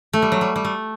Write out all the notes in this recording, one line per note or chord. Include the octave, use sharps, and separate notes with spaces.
A3
G3
F#3
G3
G3
A3